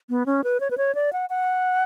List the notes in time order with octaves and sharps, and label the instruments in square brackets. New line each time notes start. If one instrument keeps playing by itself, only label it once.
[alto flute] B3
C#4
B4
C#5
B4
C#5
D5
F#5
F#5